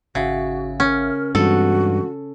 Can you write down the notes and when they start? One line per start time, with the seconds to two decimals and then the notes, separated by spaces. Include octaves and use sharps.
0.15 G#1 C#3 F#4 E5 F#5
0.80 C#4 A#4
1.35 G2 E3 G#3 C4 F#4 A4